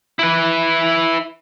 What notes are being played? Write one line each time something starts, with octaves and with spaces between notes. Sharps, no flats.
E4 B4